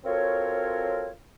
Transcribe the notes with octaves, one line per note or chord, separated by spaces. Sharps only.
C4 F4 F#4 A4 A#4 C#5